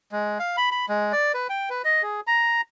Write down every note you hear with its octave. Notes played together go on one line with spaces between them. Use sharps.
G#3
F5
B5
B5
G#3
D5
B4
G5
B4
D#5
G#4
A#5